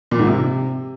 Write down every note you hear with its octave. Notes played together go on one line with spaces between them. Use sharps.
A#2
G#2
C3